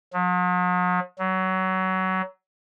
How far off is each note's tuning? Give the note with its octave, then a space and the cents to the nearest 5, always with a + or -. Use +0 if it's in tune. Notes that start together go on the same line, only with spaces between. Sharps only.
F#3 -45
F#3 +25